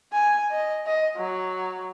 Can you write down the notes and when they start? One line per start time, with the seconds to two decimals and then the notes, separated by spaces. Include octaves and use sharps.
0.13 G#5
0.51 D#5
0.86 D#5
1.17 F#3